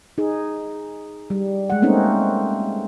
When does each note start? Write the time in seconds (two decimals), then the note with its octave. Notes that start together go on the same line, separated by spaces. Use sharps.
0.18 D#4 G#4
1.30 G3
1.70 G#3 F#5
1.82 A3 A#3 C4 C#4 D#4